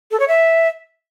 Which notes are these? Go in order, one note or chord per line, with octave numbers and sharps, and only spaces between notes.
A4
C#5
E5